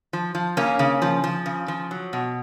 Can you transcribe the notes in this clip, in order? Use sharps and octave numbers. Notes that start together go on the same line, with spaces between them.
F3
F3
C#3 A#3 C#4
C#3
F3
F3
C#3
F3
F#3
B2